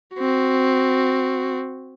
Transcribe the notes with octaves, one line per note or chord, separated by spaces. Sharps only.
C4 F#4